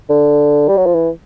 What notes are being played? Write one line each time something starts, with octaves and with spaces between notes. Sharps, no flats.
D3
G3
F#3
F3
E3